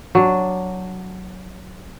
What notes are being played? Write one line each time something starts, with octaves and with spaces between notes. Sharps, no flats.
F#3 D4